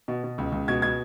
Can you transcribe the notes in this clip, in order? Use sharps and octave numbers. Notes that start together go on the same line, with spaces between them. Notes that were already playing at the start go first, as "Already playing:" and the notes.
B2
B2
C#2
C#2
B2 G#6
B2 G#6